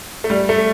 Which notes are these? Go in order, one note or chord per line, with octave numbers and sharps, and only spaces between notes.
A3
G3
A3